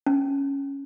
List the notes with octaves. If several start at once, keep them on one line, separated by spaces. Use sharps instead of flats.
C#4